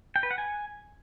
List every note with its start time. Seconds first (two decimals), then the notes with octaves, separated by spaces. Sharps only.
0.16 G5
0.23 B4
0.31 F#5
0.38 G#5